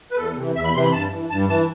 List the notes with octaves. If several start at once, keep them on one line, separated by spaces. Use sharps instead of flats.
B4
E2 A4
C3 E3
E2 E5
B5
C3 E3 C6
B5
G2 A5
E3
G2 A5
E3 A5